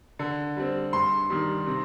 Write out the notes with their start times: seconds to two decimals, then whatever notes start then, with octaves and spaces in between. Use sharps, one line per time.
0.19 D3
0.57 G3 C4
0.93 G2 C6
1.30 D#3 G3
1.66 C3